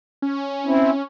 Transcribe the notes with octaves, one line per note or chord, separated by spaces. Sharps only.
C#4
C4 E4